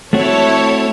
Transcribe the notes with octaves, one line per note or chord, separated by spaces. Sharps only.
A3 C4 E4 F#4 A4 C#5